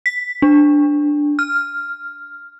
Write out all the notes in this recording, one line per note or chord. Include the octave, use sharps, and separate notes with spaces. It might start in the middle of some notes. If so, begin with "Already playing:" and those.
B6
D4
F6